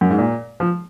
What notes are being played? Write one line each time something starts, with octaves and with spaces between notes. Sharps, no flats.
F#2
G#2
A#2
F3